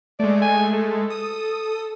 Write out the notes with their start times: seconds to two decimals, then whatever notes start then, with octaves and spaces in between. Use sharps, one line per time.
0.20 G#3 A3 D5
0.42 G#5
0.73 A4
1.10 D#6